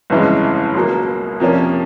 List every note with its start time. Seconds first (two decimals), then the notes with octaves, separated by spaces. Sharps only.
0.10 G1 F2 C#3 E3 G#3
0.75 C#2 B2 F#3 A#3
1.40 F2 C3 F3 A#3 C#4